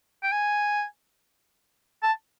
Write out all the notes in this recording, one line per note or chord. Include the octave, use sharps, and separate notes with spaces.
G5
G#5
A5